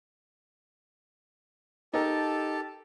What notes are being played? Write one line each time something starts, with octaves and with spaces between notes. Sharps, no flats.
D#4 G4 A4 A#4 A5